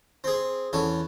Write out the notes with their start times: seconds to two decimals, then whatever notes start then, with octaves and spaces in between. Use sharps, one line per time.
0.24 C4 G#4
0.73 E2 C#4 A4